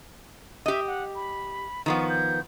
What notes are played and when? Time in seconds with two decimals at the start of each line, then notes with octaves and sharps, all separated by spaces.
0.66 G4 D#5 E5
0.87 F#5
1.15 B5
1.86 D#3 F3 B3 C#6
2.09 G6